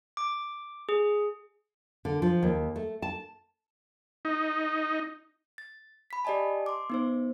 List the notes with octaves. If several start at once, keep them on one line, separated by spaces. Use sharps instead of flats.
D6
G#4
D3
F3
D#2
A3
A5
D#4
A6
B5 B6
G4 D5 D#5 G#5 A5
C6 D6
B3 D#4 C5